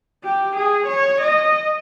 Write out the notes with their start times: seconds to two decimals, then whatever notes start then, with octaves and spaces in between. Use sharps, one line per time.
0.24 G4
0.56 G#4
0.87 C#5
1.21 D#5